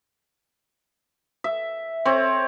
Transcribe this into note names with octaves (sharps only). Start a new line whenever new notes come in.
E5
C4 C#5